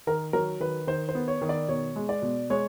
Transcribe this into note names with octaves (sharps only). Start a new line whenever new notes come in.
D#3 A#4
F#3 A#4
D#3 B4
D#3 C5
C5
B3
C#5
D#3
D5
B2 C#5
G#3
D5
B2
G#3 C#5